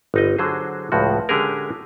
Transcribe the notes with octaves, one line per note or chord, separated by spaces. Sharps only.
G1 D#4 D#5
D3 F#3 G#4 C5
C#2 A2 F3 F#4
D3 G#3 C#4 G4 G#4 A#4